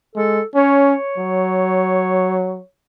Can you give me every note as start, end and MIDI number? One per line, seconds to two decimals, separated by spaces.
0.15 0.41 56
0.15 0.44 69
0.55 0.95 61
0.55 2.66 73
1.18 2.61 54